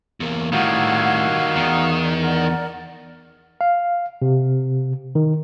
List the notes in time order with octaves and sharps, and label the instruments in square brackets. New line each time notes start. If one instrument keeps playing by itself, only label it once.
[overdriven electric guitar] E2 A#3
[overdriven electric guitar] A2 [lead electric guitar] D#3 G3 [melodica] F#4 F5 [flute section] F#5 E6 G#6
[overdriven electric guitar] E2 [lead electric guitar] D#3 [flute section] D5 D#6
[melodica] A#4 [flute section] D5 F#5
[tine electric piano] F5
C3
D#3